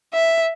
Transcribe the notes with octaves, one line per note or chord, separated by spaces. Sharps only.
E5